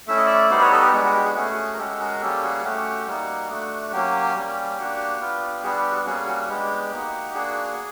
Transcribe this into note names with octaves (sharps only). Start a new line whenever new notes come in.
A3 C#4 E4 E5
D#5
D5 E5
G3 B3 D#4 F#4 C5 D5
B4 C#5
A4 B4
G4
G#3 B3 D4 F#4
F#4
G4
F#4 G#4
A3 C#4 F#4 G#4
A#4
G#3 C#4 F#4 G4 A4
G#4 A#4
G3 A#3 C#4 G4 A4
F#4 G#4
A3 C#4 F#4 G4
G3 A#3 D#4 F#4
A3 D4 F#4
F#3 A#3 C#4 G4
G3 A#3 C#4
A#3 D4 F#4
B3 D4 F4
G3 B3 D4 F#4 G#4
G4
F#4
G3 A#3 C#4 F#4 G#4
F#4
G#3 B3 D4 G4
A#3 D#4 F#4
A#3 D4 F#4 G#4